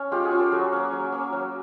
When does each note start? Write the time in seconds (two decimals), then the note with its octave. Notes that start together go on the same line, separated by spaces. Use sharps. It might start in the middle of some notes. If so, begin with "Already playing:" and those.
Already playing: C#4
0.12 G#3 F4 G4
0.24 F#4 G#4
0.31 C#4 F4
0.39 G4 A4
0.51 F#3 F#4 G#4
0.72 A#3 C#4
0.92 F#3
1.12 A#3 C#4
1.33 F#3